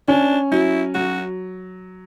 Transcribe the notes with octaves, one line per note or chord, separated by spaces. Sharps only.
C#4 D4
F#3 E4
F#3 F#4